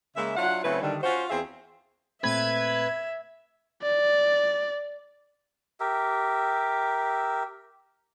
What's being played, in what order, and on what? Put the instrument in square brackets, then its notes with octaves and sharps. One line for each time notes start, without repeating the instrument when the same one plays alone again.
[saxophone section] C#3 G#3 A#3 E5
F#3 D4 E4 F4 F#5
C#3 F#3 A3 C4 E4 B4
D3 D#3 G3
C#4 F4 F#4 C5
E2 C4 F4 G#4 E5
[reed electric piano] A#2 A3 C4 [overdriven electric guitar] B4 [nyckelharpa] E5 [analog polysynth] G#6
[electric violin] D5
[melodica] G4 A#4 E5